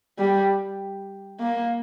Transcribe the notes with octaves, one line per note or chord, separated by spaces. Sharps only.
G3
A#3